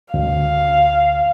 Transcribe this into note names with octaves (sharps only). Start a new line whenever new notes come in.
D2 F5